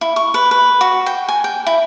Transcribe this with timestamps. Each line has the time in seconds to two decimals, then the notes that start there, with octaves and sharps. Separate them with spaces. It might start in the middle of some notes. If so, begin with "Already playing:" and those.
0.01 E4
0.16 C#6
0.34 B4
0.51 B4
0.81 F#4
1.06 G5
1.29 G#5
1.44 G5
1.66 E4